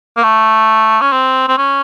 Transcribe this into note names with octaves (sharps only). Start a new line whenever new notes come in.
A#3
A3
C#4
C4
C4
C#4